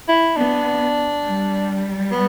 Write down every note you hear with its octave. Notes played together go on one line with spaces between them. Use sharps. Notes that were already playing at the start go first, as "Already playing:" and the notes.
E4
B3 D4
G3
B3